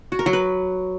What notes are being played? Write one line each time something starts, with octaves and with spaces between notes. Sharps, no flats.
F#4
A#4
F#3
B4